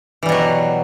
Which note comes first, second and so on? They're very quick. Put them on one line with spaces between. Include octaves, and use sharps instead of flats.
E3 G3 B2 F#3